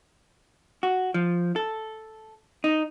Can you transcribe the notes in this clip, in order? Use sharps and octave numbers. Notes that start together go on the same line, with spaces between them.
F#4
F3
A4
D#4